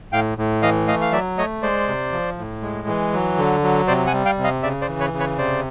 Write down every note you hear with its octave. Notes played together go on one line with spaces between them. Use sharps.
A2 F5 G5
A2
E3 D#5 F5
A3 D#5 F5
F5
F#3 D5 E5
A3 C#5 D#5
G#3 C5 D5
C3
F3
A2
G#3
E3
F#3
D3
F#3
C3 C5 D5
F#5 G#5
G3
F5 G5
C3
D#5 F5
C#3 D5 E5
C5 D5
E3
B4 C#5
C#3
B4 C#5
C3 C5 D5